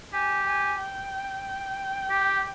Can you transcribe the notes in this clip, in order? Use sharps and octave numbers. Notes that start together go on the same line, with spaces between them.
G4 G#5
G#5
G5
G4